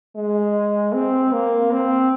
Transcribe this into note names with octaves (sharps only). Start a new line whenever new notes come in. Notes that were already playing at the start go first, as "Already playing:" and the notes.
G#3
C4
A#3
C4